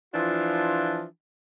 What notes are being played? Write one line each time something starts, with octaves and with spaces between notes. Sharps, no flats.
E3 F3 D4 F4